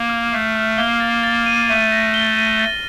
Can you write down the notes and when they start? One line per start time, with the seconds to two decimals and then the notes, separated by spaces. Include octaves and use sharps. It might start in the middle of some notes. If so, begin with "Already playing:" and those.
Already playing: A#3
0.09 F6
0.33 A3 C7
0.55 F6
0.78 A#3 G7
1.00 A6
1.23 A6
1.46 D#7
1.69 A3 D#7
1.92 A#6
2.14 G7
2.37 D#7
2.60 A6